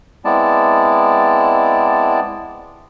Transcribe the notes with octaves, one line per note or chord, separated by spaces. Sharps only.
G#3 B3 C4 E4 D5 A5